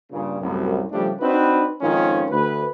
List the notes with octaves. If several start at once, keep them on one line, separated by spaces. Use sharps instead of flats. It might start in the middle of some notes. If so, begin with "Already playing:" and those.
G2 A#2 C#3
C2 F#2 A2
C#3 F3 G3 A3 D4 G4
C4 D4 D#4 F#4 B4
F2 G#2 D#3 C#4 F4
D2 B4